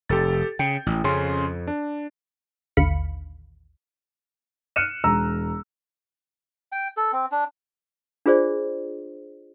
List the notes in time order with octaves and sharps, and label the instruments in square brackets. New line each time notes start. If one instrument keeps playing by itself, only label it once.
[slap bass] F1 [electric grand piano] G4 A4 A6
[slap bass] C#3 [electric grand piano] G5
[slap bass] A1
[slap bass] F2 [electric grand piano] C#3 C#4 C6
[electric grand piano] D4
[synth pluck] A1 D#2 D3 F5 B5 C#7
[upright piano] F6 F#6 C#7 D#7 E7
E1 A#5 E6
[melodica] G5
A4
C4
D4
[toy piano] D4 F4 G#4 C5 D5